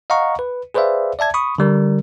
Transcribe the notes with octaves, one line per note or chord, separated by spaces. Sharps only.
D#5 F5 F#5 A#5 C#6
B4
G#4 B4 C5 D5 E5 F5
D5 E5 A5 G#6
B5 C#6 D#6
D3 G3 A#4